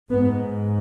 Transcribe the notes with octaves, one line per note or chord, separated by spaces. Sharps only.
G#2 B3